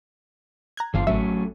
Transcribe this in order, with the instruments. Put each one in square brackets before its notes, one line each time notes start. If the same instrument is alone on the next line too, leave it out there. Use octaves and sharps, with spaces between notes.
[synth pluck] A#5 F#6 G#6
[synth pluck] G1 [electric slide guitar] E2 F3 F4
[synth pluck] A1 E5 [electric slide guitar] F#3 A3 C#4